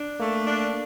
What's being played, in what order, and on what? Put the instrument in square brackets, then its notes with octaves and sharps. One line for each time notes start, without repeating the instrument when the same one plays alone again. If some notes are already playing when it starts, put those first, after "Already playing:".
Already playing: [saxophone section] D4
[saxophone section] A3 [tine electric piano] A#3
[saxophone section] D4